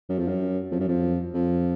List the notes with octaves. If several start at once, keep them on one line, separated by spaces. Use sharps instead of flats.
F#2
F2
F#2
F2
F#2
F2
F2